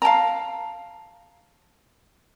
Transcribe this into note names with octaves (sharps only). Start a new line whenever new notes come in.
F5 G5 A5 A#5